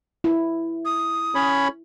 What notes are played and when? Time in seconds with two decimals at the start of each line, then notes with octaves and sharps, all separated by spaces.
0.24 E4
0.85 D#6
1.35 C#4 C#5 B5